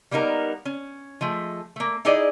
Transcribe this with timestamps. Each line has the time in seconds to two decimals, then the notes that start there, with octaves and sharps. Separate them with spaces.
0.11 G3 A#3 B3 D#4 A#4
0.65 C#4
1.21 F3 G#3 A3
1.76 A3 A#3
2.05 D#4 E4 G#4 D5 D#5